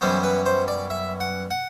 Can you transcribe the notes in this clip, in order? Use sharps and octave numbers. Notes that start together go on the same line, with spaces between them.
F#2 E3 G3 B3 C5
B4
C5
D5
E5
F#5
F#5